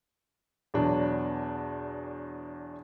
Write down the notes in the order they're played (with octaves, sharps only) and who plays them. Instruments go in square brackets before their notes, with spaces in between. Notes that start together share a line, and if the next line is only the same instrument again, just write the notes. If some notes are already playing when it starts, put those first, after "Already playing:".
[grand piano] E2 B2 F#3 D4